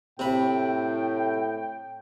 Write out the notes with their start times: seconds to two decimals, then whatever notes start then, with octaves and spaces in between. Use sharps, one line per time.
0.19 A2 C3 G5 B5